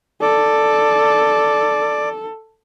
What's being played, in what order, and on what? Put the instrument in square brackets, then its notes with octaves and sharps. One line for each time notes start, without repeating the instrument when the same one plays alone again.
[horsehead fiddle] A4 [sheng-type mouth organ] D5